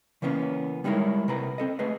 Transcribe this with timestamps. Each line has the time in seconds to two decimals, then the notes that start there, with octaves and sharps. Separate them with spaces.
0.22 C#3 E3 A#3 B3 C#4
0.84 G3 G#3 D#4 E4 A#4 C#5
1.28 C3 A#4 B4 A#5
1.58 C4 A4 D#5
1.79 A3 G#4 B4 D#5